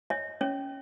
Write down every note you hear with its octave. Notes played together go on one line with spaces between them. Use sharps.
C#5 D#5
C#4 C#5